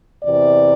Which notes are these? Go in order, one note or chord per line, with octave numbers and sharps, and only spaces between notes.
E2 C3 E3 D5